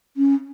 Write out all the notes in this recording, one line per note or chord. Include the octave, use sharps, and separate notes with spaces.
C#4